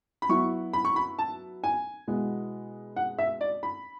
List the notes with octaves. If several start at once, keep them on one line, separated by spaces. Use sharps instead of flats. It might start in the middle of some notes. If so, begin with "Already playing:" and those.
B5
F#3 B3 E4 C#6
B5
C#6
B5
A5
G#5
B2 G#3 B3 E4
F#5
E5
D5
B5